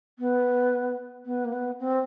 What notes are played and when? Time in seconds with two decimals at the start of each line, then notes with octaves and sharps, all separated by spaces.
0.18 B3
1.25 B3
1.44 A#3
1.52 B3
1.79 C4